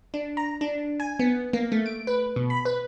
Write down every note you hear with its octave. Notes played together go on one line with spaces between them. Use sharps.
D4
A#5
D4
G#5
B3
A#3
A3
D7
B4
B2
B5
B4